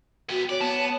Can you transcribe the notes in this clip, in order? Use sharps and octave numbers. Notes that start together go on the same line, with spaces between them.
B3 F#4 G4
C#5 D5
B3 A5